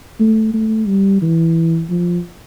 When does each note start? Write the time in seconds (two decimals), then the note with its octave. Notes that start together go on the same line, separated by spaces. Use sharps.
0.20 A3
0.53 A3
0.87 G3
1.21 E3
1.89 F3